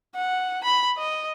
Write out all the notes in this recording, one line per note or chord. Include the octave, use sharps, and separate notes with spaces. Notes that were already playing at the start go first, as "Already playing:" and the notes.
F#5
B5
D#5